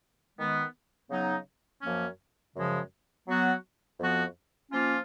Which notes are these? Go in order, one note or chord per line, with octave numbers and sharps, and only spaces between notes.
D#3 G#3 B3
C#3 F#3 B3 D#4
F#2 F3 A#3 C#4
F#2 C#3 F3 G#3
F#3 B3 F#4
F2 F3 B3 F#4
F3 A#3 C#4 F4